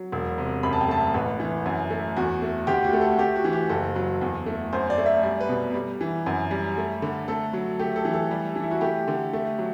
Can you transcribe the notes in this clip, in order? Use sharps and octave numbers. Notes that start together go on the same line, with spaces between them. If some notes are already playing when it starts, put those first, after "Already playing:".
Already playing: F#3
E1
C3
F#2 B5
A5
G5
A3 A5
A1 B4
E3
F#2
A3
E2 F#4
A3
D2 G4
F#4
A3
A4
A3 G4
F#4
E3
G4
F#1 A4
F#3
E2
A3
F#2 C5
D5
A3
E5
G3 D5
B4
B2
G3
E3
F#2
G3
A3
D3
A3 A4
F#3
A3 G4
A4
E3
A4
G3
E3
E4
F#4
A3 G4
D3
A3
F#3